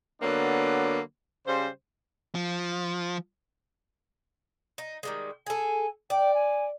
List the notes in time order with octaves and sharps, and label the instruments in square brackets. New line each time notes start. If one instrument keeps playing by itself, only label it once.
[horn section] D3 F#3 A#3 B3 D4
C#3 G3 C5
[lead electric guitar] F3
[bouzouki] D#4
D#3 G3 G#3
[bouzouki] G#4 A4 [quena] G#5
[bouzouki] D5 [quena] G5
[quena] G#5